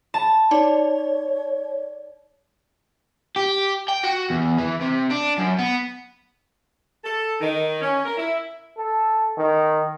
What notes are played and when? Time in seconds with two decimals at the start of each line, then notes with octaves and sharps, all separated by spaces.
0.14 A5 B5
0.51 D#4 C#5 D5
3.36 G4
3.88 G5
4.03 F#4
4.30 E2
4.58 E3
4.81 C3
5.11 D4
5.38 F#2
5.59 B3
7.04 A4
7.41 D#3
7.82 C#4
8.05 A#4
8.18 E4
8.78 A4
9.38 D#3